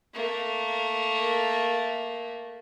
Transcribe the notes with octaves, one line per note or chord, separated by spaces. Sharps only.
A3 A#3